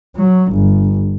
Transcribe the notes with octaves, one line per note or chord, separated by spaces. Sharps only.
F#3
G1